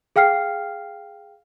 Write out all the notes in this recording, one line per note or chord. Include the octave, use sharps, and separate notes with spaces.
G#4 F5 G5 F6 C7